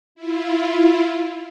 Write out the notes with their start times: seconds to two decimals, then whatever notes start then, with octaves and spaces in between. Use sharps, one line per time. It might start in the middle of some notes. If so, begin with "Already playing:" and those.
0.15 E4 F4